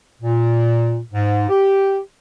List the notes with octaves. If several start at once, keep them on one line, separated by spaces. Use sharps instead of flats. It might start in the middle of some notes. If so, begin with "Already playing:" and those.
A#2
G#2
G4